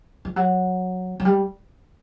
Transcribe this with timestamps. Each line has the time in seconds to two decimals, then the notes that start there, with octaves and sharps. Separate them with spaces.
0.25 F3
0.36 F#3
1.20 F#3
1.25 G3